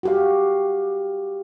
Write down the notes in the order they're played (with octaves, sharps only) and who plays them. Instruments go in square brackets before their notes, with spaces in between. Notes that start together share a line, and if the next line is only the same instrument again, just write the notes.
[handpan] F#4 G4 F5